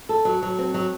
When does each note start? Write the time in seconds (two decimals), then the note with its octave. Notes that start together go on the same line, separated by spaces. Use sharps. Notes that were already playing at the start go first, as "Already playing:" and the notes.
0.09 A4
0.25 F#3
0.42 F#3
0.59 C4
0.74 F#3